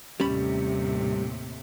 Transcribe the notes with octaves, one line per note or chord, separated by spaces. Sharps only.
D#2 A2 C3 G3 C#4 B5